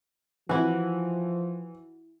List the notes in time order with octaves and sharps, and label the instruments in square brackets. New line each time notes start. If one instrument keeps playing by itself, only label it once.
[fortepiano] E3 [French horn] F3 [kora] E4 F#4